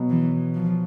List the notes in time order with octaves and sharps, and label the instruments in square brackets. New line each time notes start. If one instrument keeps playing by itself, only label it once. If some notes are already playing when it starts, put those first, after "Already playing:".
Already playing: [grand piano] B2 F#3 B3
[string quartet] E3
F3